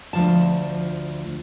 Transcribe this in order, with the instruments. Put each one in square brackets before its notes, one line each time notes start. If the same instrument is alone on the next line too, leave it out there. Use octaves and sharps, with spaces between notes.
[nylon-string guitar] D2 F3 A5